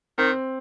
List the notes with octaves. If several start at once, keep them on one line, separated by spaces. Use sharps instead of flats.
D#3 C4